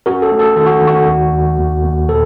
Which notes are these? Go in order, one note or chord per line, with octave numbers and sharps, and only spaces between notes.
C#4 F#4 A#4
A4
A3
A4
D#3 A4
F#4
D#3
F#4
D#2
D#2
D#2
D#2
A#2 A4